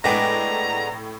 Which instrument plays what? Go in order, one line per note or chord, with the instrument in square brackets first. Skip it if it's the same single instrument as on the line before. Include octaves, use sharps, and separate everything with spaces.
[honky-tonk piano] A2 G5 A#6 [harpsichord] G#3 B3 D4 [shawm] A#5